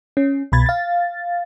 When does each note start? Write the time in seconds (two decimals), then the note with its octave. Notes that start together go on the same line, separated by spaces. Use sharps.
0.17 C#4
0.52 C2 B2 B5 G#6 A6
0.66 F5 A6